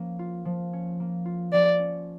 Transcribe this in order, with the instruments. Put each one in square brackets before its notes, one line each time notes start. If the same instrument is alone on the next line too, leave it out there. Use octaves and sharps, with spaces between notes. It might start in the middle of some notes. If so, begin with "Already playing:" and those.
Already playing: [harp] F3 A#3 C#4
F4
F3
C#4
A#3
F4
[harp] F3 [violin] D5
[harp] C#4